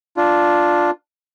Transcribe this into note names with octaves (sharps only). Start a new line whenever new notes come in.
D4 F4